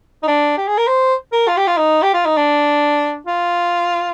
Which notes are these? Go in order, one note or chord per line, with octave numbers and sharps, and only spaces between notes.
D#4
D4
G4
G#4
A#4
C5
A#4
F4
G4
F4
D#4
G4
F4
D#4
D4
F4